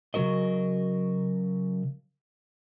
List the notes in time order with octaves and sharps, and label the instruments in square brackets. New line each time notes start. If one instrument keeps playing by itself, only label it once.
[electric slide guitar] C#3 F#3 G#3 F#4 A#4 D#5